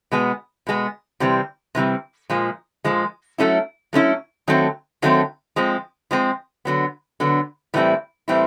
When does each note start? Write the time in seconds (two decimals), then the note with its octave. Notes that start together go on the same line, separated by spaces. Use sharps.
0.12 B2 G#3 B3
0.67 B2 G#3 B3
1.20 C3 E3 G3 C4
1.75 C3 E3 G3 C4
2.30 A#2 F3 G#3
2.85 A#2 F3 G#3
3.38 F#3 A3 C#4 E4
3.93 F#3 A3 C#4 E4
4.48 D#3 F#3 A3 C4
5.02 D#3 F#3 A3 C4
5.56 F3 G#3 C4
6.11 F3 G#3 C4
6.65 D3 F#3 B3
7.20 D3 F#3 B3
7.74 A2 E3 G3 C4 E4
8.28 A2 E3 G3 C4 E4